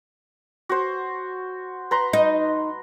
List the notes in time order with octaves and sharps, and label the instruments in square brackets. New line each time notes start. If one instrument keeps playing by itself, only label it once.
[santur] F#4 C5
B4 A#5 C6
[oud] D#4